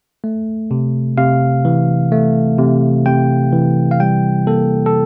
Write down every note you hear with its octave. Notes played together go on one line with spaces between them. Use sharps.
A3
C3
C3 F5
E3
A3
C3
C3 G5
E3
F5
G3 G5
A#3 A4
A4